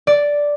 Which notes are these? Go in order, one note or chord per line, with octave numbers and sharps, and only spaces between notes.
D5